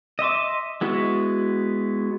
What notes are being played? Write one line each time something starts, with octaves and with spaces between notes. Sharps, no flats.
D#5 E5 C6 D6
G#3 B3 E4 F#4